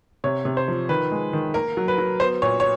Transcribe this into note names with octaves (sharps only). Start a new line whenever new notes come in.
C3 C#5
C3
C5
F3
D#3 B4
G#3
D#3
A#3 A#4
F#3
B4
F#3
B3 C5
A#2 C#5
C#5